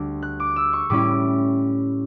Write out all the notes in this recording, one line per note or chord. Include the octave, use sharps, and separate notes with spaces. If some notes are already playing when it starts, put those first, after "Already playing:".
Already playing: D2 D3 G3 D6
F#6
D6
E6
C#6
A2 G3 C#4 E4 D6